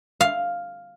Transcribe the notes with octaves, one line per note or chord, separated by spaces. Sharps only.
F5